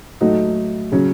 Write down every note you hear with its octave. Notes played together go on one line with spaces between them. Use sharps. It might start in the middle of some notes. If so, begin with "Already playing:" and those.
A2 F#3 A3 D#4 F#4
C#3 F#3 C#4